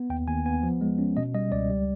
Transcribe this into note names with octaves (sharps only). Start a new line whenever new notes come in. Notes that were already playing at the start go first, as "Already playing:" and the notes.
Already playing: B3
D#2 G5
D#2 G#5
B3 G#5
F3
G#3
C#4
B2 D#5
G3 D#5
C#2 D5
G3